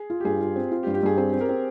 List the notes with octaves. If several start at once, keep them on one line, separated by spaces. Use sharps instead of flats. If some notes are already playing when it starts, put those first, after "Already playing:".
Already playing: G#4
F4
G4
G2 G#4
F4
C4
F4
G4
G2
G4
G2 G#4
C4 G#4
C4
G4 A#4
C4